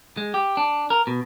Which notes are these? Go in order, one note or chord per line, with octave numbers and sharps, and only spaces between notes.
G#3
G4
D4
A#4
B2